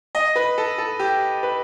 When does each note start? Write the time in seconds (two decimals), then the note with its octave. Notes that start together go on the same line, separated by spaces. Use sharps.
0.15 D#5
0.36 B4
0.58 A4
0.78 A4
0.99 G4
1.43 B4